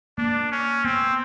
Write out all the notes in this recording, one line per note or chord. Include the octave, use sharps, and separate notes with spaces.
A#3 D4
C#4
B3 C4